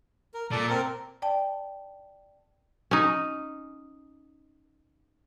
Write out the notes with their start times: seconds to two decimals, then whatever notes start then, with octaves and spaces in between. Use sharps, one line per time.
0.34 A#4
0.51 A#2 A4 D5
0.70 C4 A#4
1.22 D5 G5 A5
2.91 C#4 D#4